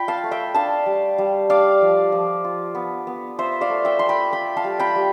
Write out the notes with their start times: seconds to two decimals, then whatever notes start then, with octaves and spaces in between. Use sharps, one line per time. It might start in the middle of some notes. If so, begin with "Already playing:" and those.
Already playing: F4 G5 B5
0.08 F5 A5
0.24 A3
0.31 E5 G5
0.54 D4 F5 A5
0.86 G3
1.18 G3
1.49 D4 D5 F5
1.81 F3
2.12 F3
2.44 F4
2.75 B3
3.07 B3
3.38 F4 C5 E5
3.61 D5 F5
3.70 A3
3.85 E5 G5
3.99 A3 C6
4.09 G5 B5
4.32 F4 G5 B5
4.57 F5 A5
4.64 G3
4.79 G5 B5
4.95 G3